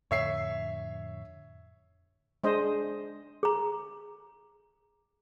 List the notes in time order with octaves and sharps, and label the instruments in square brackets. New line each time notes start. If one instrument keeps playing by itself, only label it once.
[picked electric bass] F2 A2 D3 [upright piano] C#5 E5 C7
[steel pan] G#3 D4 C5 D#5
[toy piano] G#4 A#5